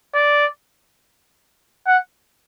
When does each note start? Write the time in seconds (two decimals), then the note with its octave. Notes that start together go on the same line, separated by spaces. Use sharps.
0.15 D5
1.87 F#5